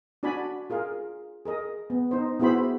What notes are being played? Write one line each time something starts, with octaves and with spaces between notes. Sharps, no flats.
D4 F#4 D5 G#5 B5
F4 G#4 A#4 F5
G#4 A#4 D#5
B3
D#4 C5
B3 E4 F#4 G#4 C5 B5